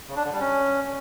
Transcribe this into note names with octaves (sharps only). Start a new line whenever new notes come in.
C#3
D4
D3
G3
C#4